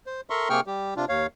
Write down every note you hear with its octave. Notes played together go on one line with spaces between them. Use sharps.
C5
A4 A#4 E5 A#5 C6 C#6
C3 A#3 G#4 G5 C#6 F6
G3 G4
C3 D4 F4
D#2 C#5 F5